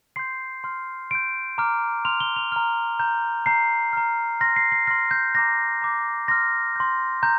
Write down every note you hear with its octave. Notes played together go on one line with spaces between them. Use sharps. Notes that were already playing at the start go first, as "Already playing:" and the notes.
C6 G6 C7
C6 F6
C6 G6 D7
A#5 D6 F6
C6 F6 F7
G7
F7
A#5 F6
A#5 G6
A#5 G6 C7
A#5 F6
C6 F6 A#6
C7
C7
C6 F6 A#6
G6
A#5 D6 G6 A#6
A#5 D6 G6
C6 F6 A#6
C6 G6
A#5 G6